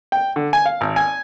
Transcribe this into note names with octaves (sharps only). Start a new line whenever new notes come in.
G5
D3
G#5
F5
G#1
G#5